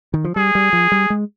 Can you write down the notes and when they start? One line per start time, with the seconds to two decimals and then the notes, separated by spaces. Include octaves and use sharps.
0.14 D#3
0.25 F3
0.36 G3 G#4
0.55 G3
0.73 F3
0.92 G3
1.10 G#3